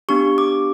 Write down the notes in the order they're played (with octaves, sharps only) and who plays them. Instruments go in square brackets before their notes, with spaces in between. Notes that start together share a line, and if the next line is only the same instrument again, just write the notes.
[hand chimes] B3 D4 G4 C#6
D6